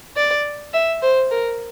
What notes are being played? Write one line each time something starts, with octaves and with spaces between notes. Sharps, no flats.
D5
E5
C5
A#4